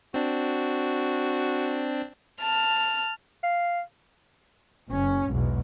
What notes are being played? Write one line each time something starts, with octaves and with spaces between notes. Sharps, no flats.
C4 D4 F#4
A5 F6
F5
F#1 C#4
B1 E2 G#2 B2